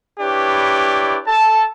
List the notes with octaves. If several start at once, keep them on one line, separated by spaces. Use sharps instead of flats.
D4 E4 G4 B4 C#5 D5
A4 A5